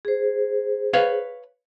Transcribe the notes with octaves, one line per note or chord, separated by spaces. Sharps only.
G#4 C5
B4 C#5 F5